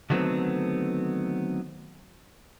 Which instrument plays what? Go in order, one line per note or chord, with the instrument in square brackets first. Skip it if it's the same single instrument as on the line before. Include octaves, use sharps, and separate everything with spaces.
[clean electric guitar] D3 D#3 F#3 A3 B3 C4